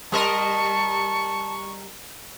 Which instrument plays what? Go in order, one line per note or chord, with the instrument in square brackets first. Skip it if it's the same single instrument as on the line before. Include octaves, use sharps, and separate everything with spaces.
[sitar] G3 A#4 D#5 [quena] A5 [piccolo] C#6